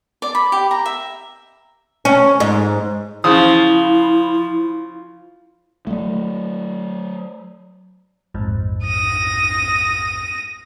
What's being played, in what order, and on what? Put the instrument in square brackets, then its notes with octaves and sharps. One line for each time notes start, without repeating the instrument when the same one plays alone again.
[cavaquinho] D5
B5
G4
A#5
E5
[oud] C#4
G#2
[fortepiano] C#3 C5 D#6 [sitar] F3 [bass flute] E4
[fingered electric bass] F#3 A3
[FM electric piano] A#1 F2 G#2
[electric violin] D#6 A#6